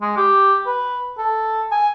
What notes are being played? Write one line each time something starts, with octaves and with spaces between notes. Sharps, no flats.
G#3
G4
B4
A4
G#5